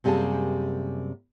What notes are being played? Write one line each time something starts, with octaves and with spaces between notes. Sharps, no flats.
F#2 C3 G3 A#3 G#4 A5